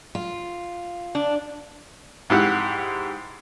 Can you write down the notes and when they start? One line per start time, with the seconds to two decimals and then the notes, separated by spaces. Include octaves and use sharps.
0.15 F4
1.15 D4
2.30 G#2 E4 G4 F#5